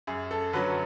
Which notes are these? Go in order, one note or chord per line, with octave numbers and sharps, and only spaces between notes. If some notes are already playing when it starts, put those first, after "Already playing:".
F#2 G#4
A4
D3 F#3 B4